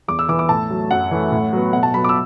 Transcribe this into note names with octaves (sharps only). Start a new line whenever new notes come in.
E2 D6
E6
E3 B3 D6
D6
A2 A5
F#3 A3
F#2 F#5
E3 A3
A2
F#3 B3
B2 F#5
A5
F#3 B3 B5
D6
E6